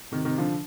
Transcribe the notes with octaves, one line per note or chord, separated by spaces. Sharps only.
C3 D#3
C3 D#3
D3 F3